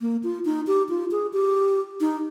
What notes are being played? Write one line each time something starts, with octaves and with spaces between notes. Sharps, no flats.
A#3
F4
D#4
G4
F4
G#4
G4
D#4